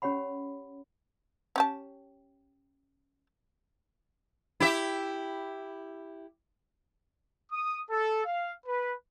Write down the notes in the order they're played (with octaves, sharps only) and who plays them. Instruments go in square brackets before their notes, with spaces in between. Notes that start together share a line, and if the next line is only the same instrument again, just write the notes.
[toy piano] C#4 G4 C#5 F#5 B5
[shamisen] C#4 G4 A5
[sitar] E4 G4 E5
[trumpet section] D#6
A4
F5
B4